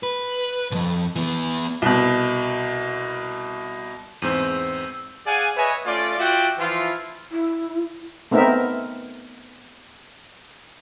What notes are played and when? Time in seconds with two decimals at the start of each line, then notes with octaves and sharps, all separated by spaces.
0.03 B4
0.71 B1 F2
1.16 E3 B3
1.82 C2 B2
4.22 E2 G#2 C4 E6 G6 D#7
5.26 G#4 D5 F5 F#5 G#5
5.57 B4 C#5 D#5 E5 G#5
5.86 A3 C#4 F4 D5
6.18 F4 F#4 D5 E5 F#5 G5
6.59 E3 F3 E4 F4
7.32 E4
8.31 A3 B3 C4 D#4 A#4 E5